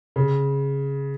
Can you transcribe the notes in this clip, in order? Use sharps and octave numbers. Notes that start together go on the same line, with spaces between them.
C#3